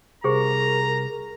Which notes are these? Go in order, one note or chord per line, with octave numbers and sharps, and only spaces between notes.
C2 G4 G#4 A#4 C5 A#5